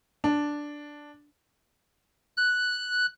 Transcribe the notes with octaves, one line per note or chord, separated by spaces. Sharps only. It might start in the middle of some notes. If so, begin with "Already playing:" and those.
D4
F#6